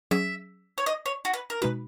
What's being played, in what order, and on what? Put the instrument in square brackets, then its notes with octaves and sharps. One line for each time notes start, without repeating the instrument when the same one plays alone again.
[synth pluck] F#3 C#4 G#4 [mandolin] E5
[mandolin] C#5
D#5
C#5
F#4
B4
A#4
[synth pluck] B2 G#3 D#4 F#4 [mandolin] B4